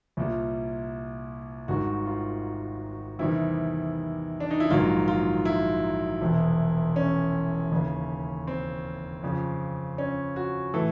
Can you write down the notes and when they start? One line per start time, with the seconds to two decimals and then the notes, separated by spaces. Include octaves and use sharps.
0.17 C2 A#2 G3
1.68 G#1 G#2 D#3 G3 F#4
2.06 F4
3.19 E2 C3 D#3 G3 E4
4.40 D4
4.50 D#4
4.60 E4
4.70 A#1 G#2 D#3 F#3 F4
5.08 F4
5.45 E4
6.21 E1 E2 C3
6.96 C#4
7.72 D#2 C#3 E3
8.47 C4
9.23 F2 C#3 F3
9.98 C#4
10.36 F#4
10.74 A2 E3 A4